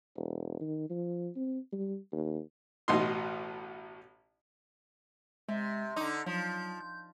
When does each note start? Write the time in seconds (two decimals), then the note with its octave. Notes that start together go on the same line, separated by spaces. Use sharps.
0.16 E1
0.60 D#3
0.90 F3
1.36 C4
1.72 G3
2.12 D#2
2.88 A1 B2 D#4 C6
5.49 C3 G#3
5.96 D3 D#4 D6
6.26 F3 F#3
6.80 G6